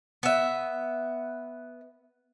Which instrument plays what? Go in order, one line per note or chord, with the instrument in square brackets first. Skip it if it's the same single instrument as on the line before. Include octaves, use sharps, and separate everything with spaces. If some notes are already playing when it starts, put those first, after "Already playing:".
[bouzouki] B3 E5